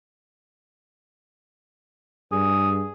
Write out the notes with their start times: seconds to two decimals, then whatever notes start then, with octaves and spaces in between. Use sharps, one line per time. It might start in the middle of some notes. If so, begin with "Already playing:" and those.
2.32 G2 G#4